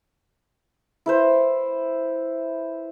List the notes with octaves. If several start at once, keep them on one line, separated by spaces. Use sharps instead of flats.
E4 B4 C5